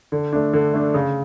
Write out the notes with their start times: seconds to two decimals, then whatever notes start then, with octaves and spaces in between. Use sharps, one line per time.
0.12 D3
0.33 A3 D4
0.53 D3
0.74 A3 D4
0.94 C#3